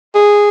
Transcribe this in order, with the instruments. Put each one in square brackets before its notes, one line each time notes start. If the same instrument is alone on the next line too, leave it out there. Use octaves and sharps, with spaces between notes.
[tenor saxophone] G#4